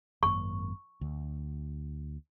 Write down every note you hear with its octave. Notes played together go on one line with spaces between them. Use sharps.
G#1 F#2 A#3 C#6
D2